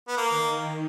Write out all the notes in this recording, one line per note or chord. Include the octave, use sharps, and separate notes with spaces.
B3
A#3
D#3